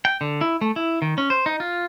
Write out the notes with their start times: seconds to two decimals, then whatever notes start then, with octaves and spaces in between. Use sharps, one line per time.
0.05 G5
0.21 D3
0.41 E4
0.61 A3
0.76 E4
1.02 D#3
1.18 C#4
1.30 C5
1.46 D#4
1.60 F4